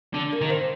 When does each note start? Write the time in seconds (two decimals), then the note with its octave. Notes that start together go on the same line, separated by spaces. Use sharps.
0.14 D3
0.33 A#3
0.41 D#3
0.45 A#3
0.50 C4